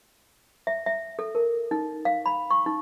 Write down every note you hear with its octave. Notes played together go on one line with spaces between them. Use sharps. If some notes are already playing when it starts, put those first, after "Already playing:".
E5
E5
A4
A#4
D#4
F5
B5
C#6
D#4